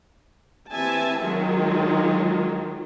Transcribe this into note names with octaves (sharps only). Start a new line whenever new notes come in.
E3 C4 G4 E5 G#5 A5
D#3 F3 F#3 G#3 D#4 F4